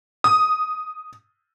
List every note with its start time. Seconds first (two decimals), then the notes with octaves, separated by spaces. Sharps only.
0.24 D#6